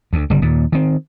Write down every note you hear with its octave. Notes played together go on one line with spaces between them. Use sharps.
D2
G1 C#3 G3
D#2 A#2
D#3 C4